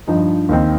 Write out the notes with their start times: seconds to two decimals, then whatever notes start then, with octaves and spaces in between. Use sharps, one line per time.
0.07 G2 F3 D#4
0.49 D#2 D#3 C4